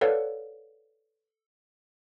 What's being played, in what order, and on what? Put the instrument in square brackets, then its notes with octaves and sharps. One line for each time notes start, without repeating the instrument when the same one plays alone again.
[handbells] A4 B4 C#5 D5 F5 F#5